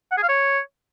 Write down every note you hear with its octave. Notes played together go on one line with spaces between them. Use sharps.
F#5
G#4
F5
C#5